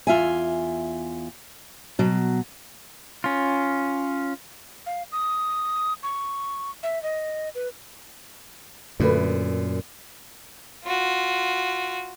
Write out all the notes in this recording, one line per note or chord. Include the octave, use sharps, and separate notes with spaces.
E2 F4 E5 G#5
B2 F#3
C#4 F4
F5
D#6
C#6
E5
D#5
B4
F#2 A#2 D3 A3 B4
F4 F#4